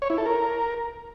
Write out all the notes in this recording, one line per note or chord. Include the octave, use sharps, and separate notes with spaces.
C#5
E4
A4
A#4